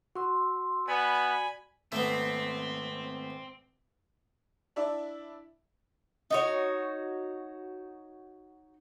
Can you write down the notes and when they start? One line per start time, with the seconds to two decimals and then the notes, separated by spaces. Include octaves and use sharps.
0.15 F#4 C6 E6
0.88 B3 D5 G#5 B5
1.92 G#1 A3 B3 C4
4.76 D4 E4 D5 E5
6.30 D#4 F#4 C#5